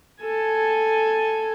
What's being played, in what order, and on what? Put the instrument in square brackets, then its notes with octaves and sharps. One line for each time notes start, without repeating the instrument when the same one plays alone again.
[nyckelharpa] A4 G#5